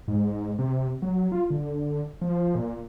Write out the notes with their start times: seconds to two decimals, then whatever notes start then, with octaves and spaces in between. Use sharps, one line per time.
0.08 G#2
0.59 C3
1.02 F#3
1.32 F4
1.50 D3
2.22 F3
2.55 A#2